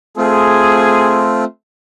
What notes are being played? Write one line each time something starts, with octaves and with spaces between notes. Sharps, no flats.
A3 C4 F4 G#4